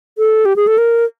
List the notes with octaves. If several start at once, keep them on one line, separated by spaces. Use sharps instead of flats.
A4
G4
G#4
A4
A#4